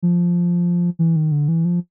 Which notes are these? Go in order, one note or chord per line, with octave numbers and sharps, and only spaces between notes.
F3
E3
D#3
D3
E3
F3